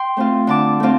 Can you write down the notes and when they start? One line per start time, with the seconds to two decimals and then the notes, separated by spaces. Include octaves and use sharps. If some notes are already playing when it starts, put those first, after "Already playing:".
Already playing: G5 C6
0.17 A3 C4 F4
0.47 D3 A5 D6
0.80 A3 C4 F4